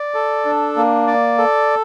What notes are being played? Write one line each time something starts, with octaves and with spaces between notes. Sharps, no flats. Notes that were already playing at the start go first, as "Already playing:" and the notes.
Already playing: D5
A4
D4
A#3
D5
A4